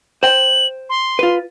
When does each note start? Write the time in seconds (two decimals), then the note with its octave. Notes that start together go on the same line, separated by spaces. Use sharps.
0.23 C5 G5 F#7
0.89 C6
1.19 F4 B4